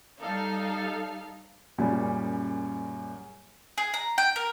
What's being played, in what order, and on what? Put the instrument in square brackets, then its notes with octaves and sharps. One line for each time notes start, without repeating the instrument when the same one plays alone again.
[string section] G3 D#4 A4 F5
[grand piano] F#2 A#2 C#3 G3
[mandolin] G#4
A#5
G5
A#4